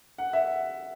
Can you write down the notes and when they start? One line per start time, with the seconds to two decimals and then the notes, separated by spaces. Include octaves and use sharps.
0.18 F#5
0.33 E5